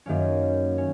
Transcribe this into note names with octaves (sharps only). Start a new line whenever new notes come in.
F#2 D#3 A#3 C#4
C#4